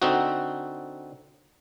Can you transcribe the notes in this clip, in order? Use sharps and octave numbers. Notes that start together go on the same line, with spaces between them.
D3 C4 D#4 F#4